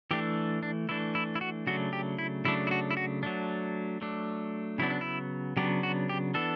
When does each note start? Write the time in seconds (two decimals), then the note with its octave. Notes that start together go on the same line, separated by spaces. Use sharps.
0.11 E3 A3 D4 G4
0.63 D4
0.89 E3 A3 D4 E4
1.15 E4
1.35 E4
1.41 F#4
1.67 C#3 F#3 A3 D4 F#4
1.93 G4
2.19 E4
2.45 C#3 F#3 A3 D4 E4
2.67 E4
2.71 F#4
2.91 E4
2.97 F#4
3.23 F#3 A3 D4
4.01 F#3 A3 D4
4.78 C#3 F#3 B3 D4 E4
4.90 D4
5.01 E4
5.57 C#3 F#3 B3 D4 G4
5.83 F#4
6.09 G4
6.34 E3 B3 D4 A4